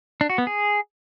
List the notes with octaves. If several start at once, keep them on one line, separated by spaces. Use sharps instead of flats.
D4
F#4
B3
G#4